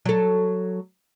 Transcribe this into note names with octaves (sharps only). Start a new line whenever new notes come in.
F#3 A4